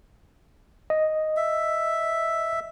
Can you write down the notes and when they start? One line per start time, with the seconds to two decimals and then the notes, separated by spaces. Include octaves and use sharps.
0.90 D#5
1.37 E5